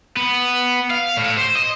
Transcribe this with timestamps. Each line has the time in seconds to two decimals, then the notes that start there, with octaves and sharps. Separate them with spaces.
0.17 B3
0.91 F5
1.17 A2
1.37 C5
1.55 D#5